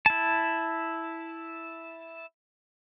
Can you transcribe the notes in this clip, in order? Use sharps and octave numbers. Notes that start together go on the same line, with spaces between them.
E4 A5